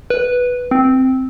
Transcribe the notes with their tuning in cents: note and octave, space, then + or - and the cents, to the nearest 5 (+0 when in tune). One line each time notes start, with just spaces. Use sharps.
B4 -5
C4 -5